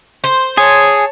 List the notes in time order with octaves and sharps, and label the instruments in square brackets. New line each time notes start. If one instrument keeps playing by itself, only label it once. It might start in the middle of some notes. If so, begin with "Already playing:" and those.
[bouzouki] C5
[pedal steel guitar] G#4 G#5 [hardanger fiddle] C#5 A5